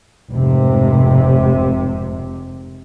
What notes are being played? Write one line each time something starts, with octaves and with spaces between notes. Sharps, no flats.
F1 G#2 C3